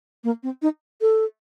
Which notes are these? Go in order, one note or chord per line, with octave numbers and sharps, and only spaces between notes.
A#3
C4
D#4
A4